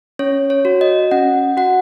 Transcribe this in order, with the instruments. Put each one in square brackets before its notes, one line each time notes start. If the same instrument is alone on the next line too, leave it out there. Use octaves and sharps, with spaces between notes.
[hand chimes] C#4 C#5
C#5
F#4
D#5
C#4 F#5
F#4 F#5